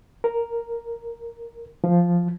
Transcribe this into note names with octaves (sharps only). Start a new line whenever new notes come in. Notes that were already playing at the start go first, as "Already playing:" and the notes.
A#4
F3